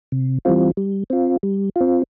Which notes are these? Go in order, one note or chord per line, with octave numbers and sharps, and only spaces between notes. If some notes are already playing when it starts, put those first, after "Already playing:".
C3
E3 G3 C4 F4
G3
C4 F4
G3
C4 F4